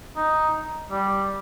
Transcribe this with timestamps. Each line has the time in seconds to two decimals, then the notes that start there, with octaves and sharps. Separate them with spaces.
0.17 D#4
0.91 G3